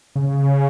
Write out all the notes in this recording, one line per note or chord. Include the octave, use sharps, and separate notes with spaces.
C#3